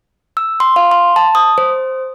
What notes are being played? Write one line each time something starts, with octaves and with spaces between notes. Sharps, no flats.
E6
C6
F5
C6
A5
D#6
C5